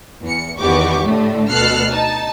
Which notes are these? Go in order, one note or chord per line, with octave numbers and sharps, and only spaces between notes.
E2 C#7
E2 D#3 B3 G4 C#6 D6
A2 D3 A3
D2 B2 A4 F6 F#6 C7
D#4 A5